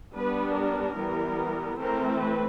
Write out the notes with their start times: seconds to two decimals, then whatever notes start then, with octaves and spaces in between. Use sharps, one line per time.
0.14 G3 B3 D4 B4
0.55 A#4
0.96 E3 G3 B3
1.77 E3 A3 C4 A#4
2.18 B4